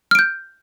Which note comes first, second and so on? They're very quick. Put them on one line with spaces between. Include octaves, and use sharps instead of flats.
F6 D7 G6